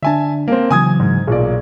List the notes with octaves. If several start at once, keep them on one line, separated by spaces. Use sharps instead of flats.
D3 D4 E5 G#5 A5
A#3 C4
C#3 E3 F#3 G#5 D#6 G#6
G#2
B1 A#2 G#4 D5